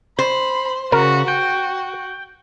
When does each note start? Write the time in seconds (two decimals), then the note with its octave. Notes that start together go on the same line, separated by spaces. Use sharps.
0.19 C5 B5
0.92 C#3 F#4 A#4
1.28 F#4 G5